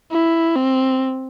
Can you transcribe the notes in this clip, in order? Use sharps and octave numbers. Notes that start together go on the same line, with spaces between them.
E4
C4